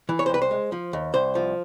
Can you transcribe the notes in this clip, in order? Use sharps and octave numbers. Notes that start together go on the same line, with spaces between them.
E3
C#5
C5
C2 B4
C5
G#3
F3
D#2
C2 C5
F3